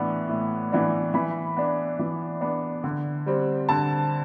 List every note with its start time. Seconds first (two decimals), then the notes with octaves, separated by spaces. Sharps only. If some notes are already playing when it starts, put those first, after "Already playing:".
Already playing: A2 E3 B3 D4
0.29 A2
0.72 E3 B3 D4
1.14 E3 B5
1.57 B3 D4
1.99 E3
2.41 B3 D4
2.84 D3
3.26 G3 C4
3.69 D3 A5